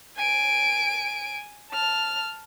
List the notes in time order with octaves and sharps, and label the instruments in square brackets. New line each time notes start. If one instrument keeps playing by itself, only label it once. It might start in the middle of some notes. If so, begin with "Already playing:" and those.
[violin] G#5 D7
A5 F6